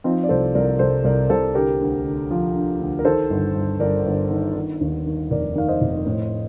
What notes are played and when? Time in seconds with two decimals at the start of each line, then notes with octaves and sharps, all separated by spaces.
0.04 F3 C4 D#4
0.23 D5
0.29 C2 A4 C5
0.55 C2 A#4 D5
0.79 C2 A4 C5
1.04 C2 A#4 D5
1.29 C2 A4 C5
1.55 D3 G4 A#4
1.81 D2
2.05 D3
2.30 F3
2.55 D3
2.80 D2
2.99 A#4
3.05 D#3 A4 C5
3.30 G1
3.56 G1
3.80 G1 A#4 D5
4.06 G1
4.30 D#3
4.55 D#3
4.81 D#2
5.06 D#3
5.30 F1 A#4 D5
5.55 D#3 F5
5.68 C5 D#5
5.81 F1
6.06 A2